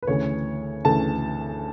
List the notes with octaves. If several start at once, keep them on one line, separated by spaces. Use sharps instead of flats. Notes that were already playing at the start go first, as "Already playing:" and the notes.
B4
D2 C#3 E3 A3 C#5
D2 C#3 E3 A3 A5